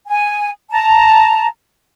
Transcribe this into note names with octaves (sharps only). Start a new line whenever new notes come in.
G#5
A5 A#5